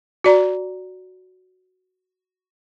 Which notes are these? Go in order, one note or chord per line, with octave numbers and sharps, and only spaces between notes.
F#4 D5 A#5